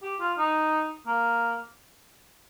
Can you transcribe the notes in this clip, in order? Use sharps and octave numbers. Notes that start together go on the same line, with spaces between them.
G4
F4
D#4
A#3